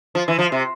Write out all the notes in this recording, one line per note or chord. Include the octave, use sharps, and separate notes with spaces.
F3
E3
F3
C3